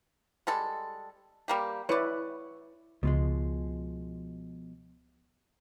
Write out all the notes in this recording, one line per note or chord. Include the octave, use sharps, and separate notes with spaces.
G3 G#3 A4
G3 A#3 G4
E4 B4 C#5 D5 C#6
C#2 B2 F3 G#3